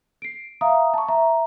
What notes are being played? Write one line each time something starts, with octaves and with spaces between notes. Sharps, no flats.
C7 D7
E5 F5 A#5 D#6
A5 C#6
E5 A#5